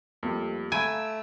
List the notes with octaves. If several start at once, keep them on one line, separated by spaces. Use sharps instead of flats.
F2 G3 A3 A#3
A3 F5 G#5 A#5 B5 E6 D7